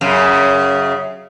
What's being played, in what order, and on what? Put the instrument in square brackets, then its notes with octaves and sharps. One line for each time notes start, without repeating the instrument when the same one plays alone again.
[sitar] F#2 C#3